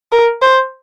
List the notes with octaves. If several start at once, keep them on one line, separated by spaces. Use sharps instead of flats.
A#4
C5